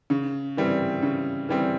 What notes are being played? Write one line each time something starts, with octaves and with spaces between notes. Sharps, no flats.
C#3
E3 G3 C4
C#3
E3 G3 C4